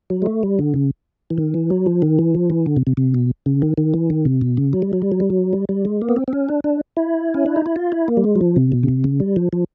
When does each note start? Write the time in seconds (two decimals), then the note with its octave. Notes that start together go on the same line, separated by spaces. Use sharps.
0.10 F#3
0.22 G#3
0.26 A3
0.43 G3
0.59 D3
0.74 C#3
1.30 E3
1.38 D#3
1.54 E3
1.70 F#3
1.86 F3
2.02 D#3
2.19 E3
2.35 F3
2.50 E3
2.66 D3
2.76 C3
2.87 C3
2.97 C3
3.14 B2
3.46 C#3
3.62 D#3
3.78 D#3
3.94 E3
4.10 D#3
4.25 C3
4.41 B2
4.57 C#3
4.73 F#3
4.82 G3
4.93 F#3
5.02 G3
5.12 F#3
5.20 G3
5.30 F#3
5.53 G3
5.69 G3
5.85 G#3
6.02 A#3
6.09 B3
6.16 C4
6.28 C4
6.33 C#4
6.49 D4
6.64 D4
6.97 E4
7.34 C#4
7.46 D4
7.56 D#4
7.66 E4
7.76 F4
7.92 E4
8.08 A#3
8.17 G3
8.24 G#3
8.35 F#3
8.41 F3
8.56 C3
8.72 B2
8.83 C#3
8.88 C3
9.04 C#3
9.20 G3
9.36 F3
9.53 F3